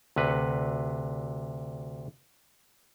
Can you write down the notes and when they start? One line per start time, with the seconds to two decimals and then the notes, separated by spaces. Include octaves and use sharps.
0.16 D2 C3 B4